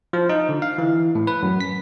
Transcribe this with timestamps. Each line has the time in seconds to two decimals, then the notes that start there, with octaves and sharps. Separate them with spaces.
0.13 F3
0.29 D#4
0.49 D3
0.62 F5
0.78 E3
1.15 A2
1.27 B4
1.43 F#2
1.61 B6